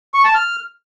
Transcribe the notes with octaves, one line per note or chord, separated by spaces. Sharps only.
C#6
A5
F6